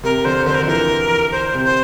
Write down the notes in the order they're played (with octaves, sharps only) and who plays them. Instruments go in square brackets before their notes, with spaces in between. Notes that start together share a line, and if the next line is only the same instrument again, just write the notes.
[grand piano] C3 [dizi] A#4
[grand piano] D3 [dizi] C5
[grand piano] D3 [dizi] C5
[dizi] A#4
[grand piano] D3
[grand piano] E3 [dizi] A#4
[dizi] C5
[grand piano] C3
[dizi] C5